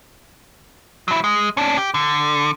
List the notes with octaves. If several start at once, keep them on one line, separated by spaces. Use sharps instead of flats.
F#3 E4
G#3
C#4 D4
G4
D3